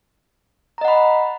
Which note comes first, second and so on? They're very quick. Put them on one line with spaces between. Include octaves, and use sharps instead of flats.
A#5 D#5 F#5 B5